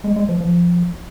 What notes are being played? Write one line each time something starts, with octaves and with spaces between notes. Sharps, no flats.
G#3
G#3
F3
F3